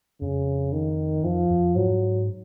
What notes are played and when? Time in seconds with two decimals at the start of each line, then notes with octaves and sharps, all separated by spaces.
0.21 F2 C#3
0.72 D#3
1.24 F2 F3
1.51 F2
1.75 G#2 F#3